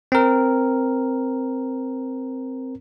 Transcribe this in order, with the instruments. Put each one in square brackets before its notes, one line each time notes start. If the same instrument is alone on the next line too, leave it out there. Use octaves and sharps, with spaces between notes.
[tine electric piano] C4 A#4